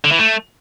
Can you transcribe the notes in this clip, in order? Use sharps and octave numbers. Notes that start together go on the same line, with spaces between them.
D3
E3
A3